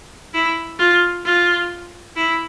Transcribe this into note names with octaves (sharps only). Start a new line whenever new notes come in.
E4
F4
F4
E4